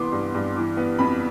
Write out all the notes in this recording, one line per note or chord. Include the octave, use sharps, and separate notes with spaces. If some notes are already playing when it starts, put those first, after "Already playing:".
Already playing: C2 E3 B3 C6 D6
G2
G2
E3
B3
F2 B5